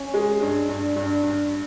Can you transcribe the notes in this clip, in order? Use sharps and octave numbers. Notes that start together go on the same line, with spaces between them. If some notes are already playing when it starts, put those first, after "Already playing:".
Already playing: C#4
G#3
G2
G2
G2
G2